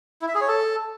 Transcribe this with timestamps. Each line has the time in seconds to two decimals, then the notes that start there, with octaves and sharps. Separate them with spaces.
0.22 E4
0.28 E5
0.35 G#4
0.41 C#5
0.48 A4